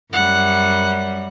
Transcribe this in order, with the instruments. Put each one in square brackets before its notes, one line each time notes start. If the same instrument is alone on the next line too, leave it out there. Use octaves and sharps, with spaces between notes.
[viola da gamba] F#2 G3 [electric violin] F#5